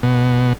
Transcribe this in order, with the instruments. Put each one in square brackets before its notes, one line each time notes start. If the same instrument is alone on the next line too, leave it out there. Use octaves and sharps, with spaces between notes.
[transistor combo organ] B2